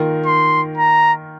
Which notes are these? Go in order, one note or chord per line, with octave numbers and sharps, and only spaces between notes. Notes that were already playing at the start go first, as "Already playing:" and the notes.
Already playing: D#3 A#3 F4 A#4
C6
A#5